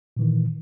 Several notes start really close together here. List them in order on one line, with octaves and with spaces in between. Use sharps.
A#2 E3 D#3